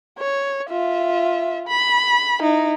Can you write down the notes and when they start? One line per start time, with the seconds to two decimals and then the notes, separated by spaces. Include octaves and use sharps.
0.18 C#5
0.70 F4 E5
1.68 B5
2.41 D#4 E4